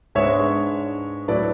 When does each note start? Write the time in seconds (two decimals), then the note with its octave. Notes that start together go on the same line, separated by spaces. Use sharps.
0.15 G#2 G#3 B3 D4 C#5 E5
1.28 A2 F#3 A3 E4 B4 D5